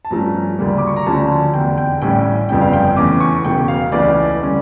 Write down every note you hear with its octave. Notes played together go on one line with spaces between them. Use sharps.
A5
G2 F3 A3 C#4 A#5
D2 C#3 G3 A#3
D6
C#6
A#5
D2 D3 F3 A3 C#4 A5
F1 E2 D3 G5
G5
A1 A2 G3 C#4 G5
G1 F2 C#3 G3 C#4 G5
F5
G5
E2 E3 A3 C#4 D6
C#6
E1 E2 C#3 G5
F5
C#2 C#3 E3 A3 C#4 D5
D3 G3 C#4